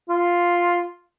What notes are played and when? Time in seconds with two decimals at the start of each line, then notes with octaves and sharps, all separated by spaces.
0.09 F4